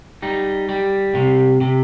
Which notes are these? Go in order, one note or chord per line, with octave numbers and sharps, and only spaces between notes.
G3 D#4
G3
C3
C3